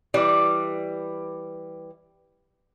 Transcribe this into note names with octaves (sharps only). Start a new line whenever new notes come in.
E3 G3 D5